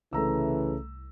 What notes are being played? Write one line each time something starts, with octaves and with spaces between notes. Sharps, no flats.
C2 C#3 E3 A3 A#5 E6